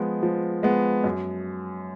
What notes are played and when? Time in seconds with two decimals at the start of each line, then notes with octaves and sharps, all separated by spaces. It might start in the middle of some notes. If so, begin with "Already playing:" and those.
Already playing: F3 G#3 B3
0.23 F3
0.63 G#3 B3
1.04 F#2